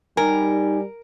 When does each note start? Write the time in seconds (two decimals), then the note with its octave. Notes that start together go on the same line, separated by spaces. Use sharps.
0.17 G3 D#4 A#4 G#5